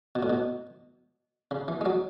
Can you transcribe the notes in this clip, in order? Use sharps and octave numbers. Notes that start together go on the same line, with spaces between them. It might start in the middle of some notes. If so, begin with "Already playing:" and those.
B2
A2
B2
C#3
E3
G#3
F#3